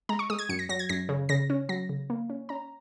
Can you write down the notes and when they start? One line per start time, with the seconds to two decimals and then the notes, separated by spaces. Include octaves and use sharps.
0.09 G#3 A#5
0.19 C#6
0.30 G#3 D#6
0.39 G#6
0.49 F#2 C#7
0.59 A#6
0.69 F#3 A#6
0.79 G#6
0.89 F#2 A#6
1.09 C#3
1.29 C#3 A#6
1.50 C#4
1.69 F#3 A#6
1.89 C#3
2.10 A#3
2.30 C#4
2.49 C#4 A#5